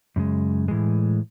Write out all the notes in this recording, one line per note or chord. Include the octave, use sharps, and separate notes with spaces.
F#2 C#3 G#3
A2 E3 G#3